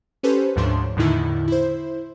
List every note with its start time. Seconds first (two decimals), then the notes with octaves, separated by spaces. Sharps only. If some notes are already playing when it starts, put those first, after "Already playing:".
0.23 C#4 G4 A4 B4 C5
0.56 D2 G#2 F3 D4 C#5 C6
0.97 E2 A2 D3 D#3 D#4 E4
1.48 E4 C5